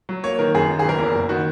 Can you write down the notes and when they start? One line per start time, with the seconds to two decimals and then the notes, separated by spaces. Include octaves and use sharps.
0.09 F#3
0.24 A#3 C#5
0.39 D#3 A#4
0.55 F#2 G#4
0.69 D#3
0.79 G#4
0.84 F#1 A#4
0.99 E2
1.15 F#1
1.29 D#3 F#4